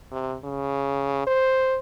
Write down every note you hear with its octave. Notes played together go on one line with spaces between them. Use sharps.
C3
C#3
C5